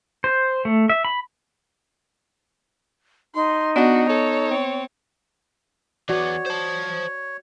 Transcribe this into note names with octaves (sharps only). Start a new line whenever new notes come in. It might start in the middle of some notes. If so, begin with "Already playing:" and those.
C5
A3
E5
B5
D#4 C6
B3 D4 F#4 D#5
A4 C#5
C4
E3 B3 F#4 C#5 D5
C5 A5